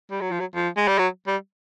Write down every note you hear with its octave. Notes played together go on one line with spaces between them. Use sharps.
G3
F#3
F3
F#3
F3
G#3
G3
F#3
G3